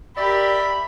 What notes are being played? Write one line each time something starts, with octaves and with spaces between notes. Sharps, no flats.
G4 A#4 D5 E5 B5